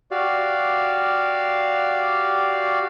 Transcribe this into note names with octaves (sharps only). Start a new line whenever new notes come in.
F#4 G4 D5 F5